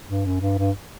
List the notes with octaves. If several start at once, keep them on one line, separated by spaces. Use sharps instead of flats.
G2
F#2
G2
G2